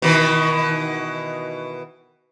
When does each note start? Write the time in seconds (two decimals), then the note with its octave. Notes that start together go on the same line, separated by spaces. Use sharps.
0.02 B2 D#3 E3